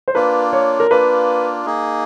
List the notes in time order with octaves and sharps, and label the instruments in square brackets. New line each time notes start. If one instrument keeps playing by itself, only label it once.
[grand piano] C5
[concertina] A#3 D4 F4 [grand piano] B4
[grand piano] C#5
A#4
[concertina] A#3 D4 F4 [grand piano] B4
[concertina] A#3 D#4 G#4